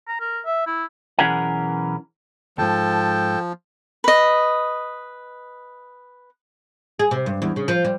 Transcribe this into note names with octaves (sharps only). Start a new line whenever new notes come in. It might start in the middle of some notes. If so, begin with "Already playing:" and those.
A#5
A#4
E5
E4
B1 E3 C#4 G#4 A#4 F#5
D2 G#2 F3 A4 G5 A5
B4 D#5
G#4
C3
G2
E2
C#3
F3
G3